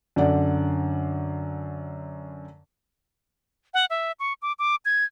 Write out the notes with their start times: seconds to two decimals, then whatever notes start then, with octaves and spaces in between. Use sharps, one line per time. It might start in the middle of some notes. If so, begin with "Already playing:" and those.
0.16 F#2 D3 D5 F#5
3.74 F#5
3.90 E5
4.20 C#6
4.42 D6
4.59 D6
4.85 G#6